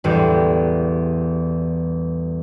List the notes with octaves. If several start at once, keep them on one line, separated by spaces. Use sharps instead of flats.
A1 E2 A2 G3